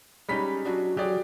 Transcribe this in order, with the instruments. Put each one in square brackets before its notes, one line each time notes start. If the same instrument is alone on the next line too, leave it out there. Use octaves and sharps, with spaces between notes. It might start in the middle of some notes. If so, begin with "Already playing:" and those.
[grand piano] G3 B5 B6 [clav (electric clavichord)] G#3 C#4 D#4
[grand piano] F#3 D4 [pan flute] F#4
[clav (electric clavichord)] F#3 [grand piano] G4 G#4 D5